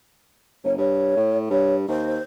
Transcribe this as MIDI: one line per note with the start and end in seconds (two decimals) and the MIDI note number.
0.64 0.74 30
0.64 0.73 73
0.78 1.15 43
0.78 1.36 73
1.17 1.48 45
1.50 1.88 43
1.50 1.74 73
1.89 2.18 39
1.89 2.22 72